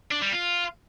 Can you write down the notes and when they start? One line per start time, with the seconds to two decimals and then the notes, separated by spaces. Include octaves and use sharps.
0.11 D4
0.22 G3
0.33 F4